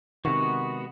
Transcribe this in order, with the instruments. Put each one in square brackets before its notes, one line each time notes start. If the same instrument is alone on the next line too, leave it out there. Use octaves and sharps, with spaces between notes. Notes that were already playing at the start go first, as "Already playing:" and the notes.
[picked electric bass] C3 D#3 [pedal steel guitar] G#3 B3 F#4 [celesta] C#6